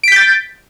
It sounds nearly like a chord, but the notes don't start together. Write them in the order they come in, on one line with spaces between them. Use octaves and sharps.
D7 B6 G6 A6